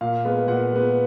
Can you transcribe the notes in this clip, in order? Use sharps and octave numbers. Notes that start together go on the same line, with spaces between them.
A#2 F5
G#3 B3
A#2 F#5
G#3 B3